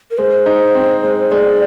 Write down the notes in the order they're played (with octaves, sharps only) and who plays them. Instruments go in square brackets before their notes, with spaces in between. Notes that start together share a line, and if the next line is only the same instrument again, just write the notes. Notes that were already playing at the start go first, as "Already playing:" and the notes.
[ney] A#4
[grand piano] G#3 [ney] C5
[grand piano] D#4
C4
G#3
[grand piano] G#3 [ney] D5